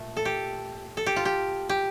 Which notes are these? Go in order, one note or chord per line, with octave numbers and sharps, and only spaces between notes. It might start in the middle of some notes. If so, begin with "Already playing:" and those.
Already playing: A#2 A3
A4
G4
A4
G4
F4
G4
G4